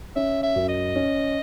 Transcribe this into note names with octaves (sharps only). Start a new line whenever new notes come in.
C#4 E5
E5
F#2
D#5
C#4